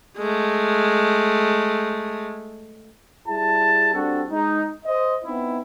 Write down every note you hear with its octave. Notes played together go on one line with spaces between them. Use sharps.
G#3 A3
G3 E4 G#4 A5
G3 C4 D4 F#4 A4
G#3 D#4
C5 D#5
B3 C4 D#4 E4